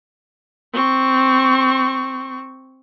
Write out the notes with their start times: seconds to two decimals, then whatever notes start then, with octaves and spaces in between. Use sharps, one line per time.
0.73 C4 C#6